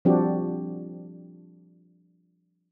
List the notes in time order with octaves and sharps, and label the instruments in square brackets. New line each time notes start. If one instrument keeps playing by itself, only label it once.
[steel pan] F3 G3 C4 D4 F#4 G4